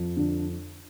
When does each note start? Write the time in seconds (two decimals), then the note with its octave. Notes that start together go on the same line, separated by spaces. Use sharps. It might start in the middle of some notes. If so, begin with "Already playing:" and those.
Already playing: F2
0.17 D3